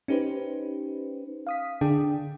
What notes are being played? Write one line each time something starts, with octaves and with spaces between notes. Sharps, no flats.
C#4 D#4 G4 B4 C5
F5 D#6 B6
D3 D4 G#4 G5